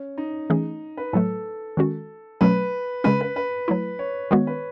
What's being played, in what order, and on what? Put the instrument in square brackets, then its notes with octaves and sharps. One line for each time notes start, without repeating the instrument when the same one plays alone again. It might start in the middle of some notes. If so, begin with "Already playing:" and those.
Already playing: [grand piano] C#4
D#4
[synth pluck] E3 A3 C#4 G#4
[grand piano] B4
[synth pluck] A2 F#3 A3 [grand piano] A4
[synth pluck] D#3 G#3 C#4 F#4
[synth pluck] B2 F#3 A3 C#4 [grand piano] B4
[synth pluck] C#3 G#3 C#4 [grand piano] B4
[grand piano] B4
B4
[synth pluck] F#3 A3 E4
[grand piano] C#5
[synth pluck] D#3 G#3 B3 F#4 [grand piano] C#5
[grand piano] B4